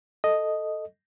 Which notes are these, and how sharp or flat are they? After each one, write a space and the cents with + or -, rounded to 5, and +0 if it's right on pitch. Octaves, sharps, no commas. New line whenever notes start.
A4 +0 D#5 +0